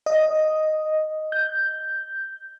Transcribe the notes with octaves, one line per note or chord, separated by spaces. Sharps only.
D#5
G6